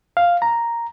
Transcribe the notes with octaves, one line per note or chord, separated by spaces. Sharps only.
F5
A#5